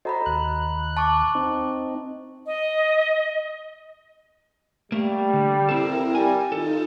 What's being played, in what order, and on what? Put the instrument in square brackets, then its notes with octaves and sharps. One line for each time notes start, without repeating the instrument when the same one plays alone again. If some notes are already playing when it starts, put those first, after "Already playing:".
[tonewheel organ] F#4 A4 C5 [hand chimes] D#5 A#5 B5
[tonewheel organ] D#2 F#6
[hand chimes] A5 C#6 D6
[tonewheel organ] C4 D#4
[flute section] D#5
[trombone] G3 [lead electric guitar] A3 A#3
[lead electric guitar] D3
[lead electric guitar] C4 A4 [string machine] E4 A#4
[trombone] G3 [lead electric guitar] G#5
[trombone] D#3 [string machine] D#4 F4 [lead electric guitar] A4